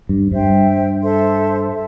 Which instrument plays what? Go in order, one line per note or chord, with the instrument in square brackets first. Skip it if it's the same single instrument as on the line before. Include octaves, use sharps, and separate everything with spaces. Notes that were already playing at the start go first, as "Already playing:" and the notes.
[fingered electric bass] G2
[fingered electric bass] G2 [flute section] C5 E5 G5
[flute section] A4 C5 E5 C6
A4 E5